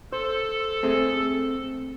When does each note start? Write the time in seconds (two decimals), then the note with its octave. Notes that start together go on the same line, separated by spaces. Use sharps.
0.12 A4 C5
0.83 A3 C4 G#4